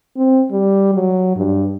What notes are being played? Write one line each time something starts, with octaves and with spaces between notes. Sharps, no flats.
C4
G3
F#3
G2